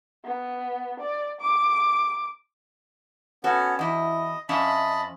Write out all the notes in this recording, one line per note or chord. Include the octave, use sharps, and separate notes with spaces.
B3
D5
D6
B3 C#4 F#4 A4
E2 E4 D#5
F2 C#4 D#5 E5 A5 B5